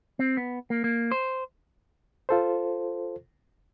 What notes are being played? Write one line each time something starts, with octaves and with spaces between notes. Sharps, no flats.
C4
B3
A#3
A#3
C5
F4 A4 C5